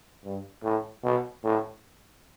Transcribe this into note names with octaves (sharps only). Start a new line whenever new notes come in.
G2
A2
B2
A2